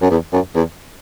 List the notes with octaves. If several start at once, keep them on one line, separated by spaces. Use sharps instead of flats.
F#2
E2
F#2
E2